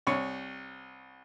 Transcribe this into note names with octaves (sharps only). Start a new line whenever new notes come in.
C2 C#5